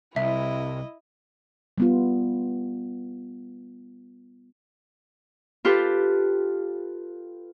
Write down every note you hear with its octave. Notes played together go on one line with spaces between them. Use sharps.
C2 E4 D#5 E5
G3 B3 F4
F4 G4 A4 B4